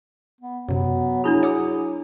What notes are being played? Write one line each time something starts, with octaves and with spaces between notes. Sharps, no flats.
B3
F#2 C3 F#3 B3
D4 E4 G#4 B5
C#5 D6 D#6